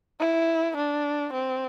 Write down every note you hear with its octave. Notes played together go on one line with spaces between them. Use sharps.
E4
D4
C4